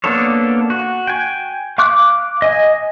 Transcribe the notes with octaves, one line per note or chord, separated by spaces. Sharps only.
A#3 B3 D4 A4 C#5
F#4
G5 G#5
F5 C#6 D6 F#6
D#5 G#5